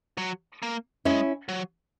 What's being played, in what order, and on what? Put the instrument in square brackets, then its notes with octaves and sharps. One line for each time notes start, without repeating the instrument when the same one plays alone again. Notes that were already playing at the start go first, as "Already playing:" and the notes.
[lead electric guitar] F#3
A#3
[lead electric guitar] G#3 [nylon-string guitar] C#4 E4
[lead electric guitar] F#3